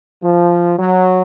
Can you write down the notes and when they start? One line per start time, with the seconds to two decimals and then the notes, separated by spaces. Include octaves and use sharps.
0.24 F3
0.78 F#3